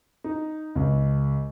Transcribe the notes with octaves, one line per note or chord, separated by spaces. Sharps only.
D#4
C#2